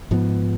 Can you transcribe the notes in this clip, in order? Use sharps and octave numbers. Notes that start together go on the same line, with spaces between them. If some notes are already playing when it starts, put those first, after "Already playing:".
G#2 F3 B3